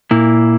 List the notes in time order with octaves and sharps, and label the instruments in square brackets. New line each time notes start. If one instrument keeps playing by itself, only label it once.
[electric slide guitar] A#2 A#3 E4